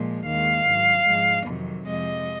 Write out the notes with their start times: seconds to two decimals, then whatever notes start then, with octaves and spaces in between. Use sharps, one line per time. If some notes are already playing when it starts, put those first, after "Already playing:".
Already playing: A#2 F3 G#3
0.25 D#2 D#3 G#3 F5
0.66 G#2 F#3
1.05 G#2 F3 G#3
1.46 F2 C3 D#3 F#3
1.86 F2 C3 F3 G#3 D#5